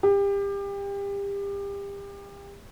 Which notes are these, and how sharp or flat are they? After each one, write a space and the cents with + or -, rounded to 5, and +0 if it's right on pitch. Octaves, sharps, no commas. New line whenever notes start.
G4 +30